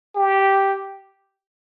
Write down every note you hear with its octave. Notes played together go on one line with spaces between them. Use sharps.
G4